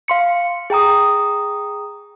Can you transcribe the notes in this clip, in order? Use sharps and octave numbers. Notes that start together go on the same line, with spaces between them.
F5 C6 C#7
G#4 G5 A#5 D#6